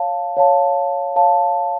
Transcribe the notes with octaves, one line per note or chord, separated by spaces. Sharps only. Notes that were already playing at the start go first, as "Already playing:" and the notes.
Already playing: C#5 F5 A5
C#5 F5 A5
C#5 F5 A5